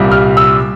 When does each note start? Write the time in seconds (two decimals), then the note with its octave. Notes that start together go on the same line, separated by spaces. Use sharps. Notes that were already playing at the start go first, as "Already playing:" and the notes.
Already playing: C2 A#2 G3
0.12 F6
0.37 E6